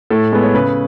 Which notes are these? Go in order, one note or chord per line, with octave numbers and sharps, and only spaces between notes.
A2 A4
G#3 B3
C#5
C#3 B4